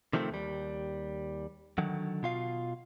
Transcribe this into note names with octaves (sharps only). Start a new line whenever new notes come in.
C3 D#3 F3 A3 C4
D#2 G3
D3 D#3 F#3
B2 F4 F5